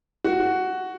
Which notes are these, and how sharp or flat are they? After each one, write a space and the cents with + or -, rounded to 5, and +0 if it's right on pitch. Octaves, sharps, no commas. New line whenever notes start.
F#4 +5